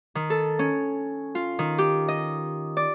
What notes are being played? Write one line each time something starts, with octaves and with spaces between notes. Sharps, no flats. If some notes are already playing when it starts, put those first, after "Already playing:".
D#3
A4
C#4
F4
D#3
G4
D#5
D5